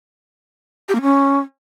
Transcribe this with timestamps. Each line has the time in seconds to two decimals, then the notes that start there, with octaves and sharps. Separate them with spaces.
0.89 G4
0.95 A#3
1.02 C#4